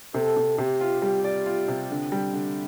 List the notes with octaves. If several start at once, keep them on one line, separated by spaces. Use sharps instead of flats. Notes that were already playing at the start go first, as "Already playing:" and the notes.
C3 A4
C3
C3 G4
F4
G3 G4
D5
F4
C3
D3
G3
D3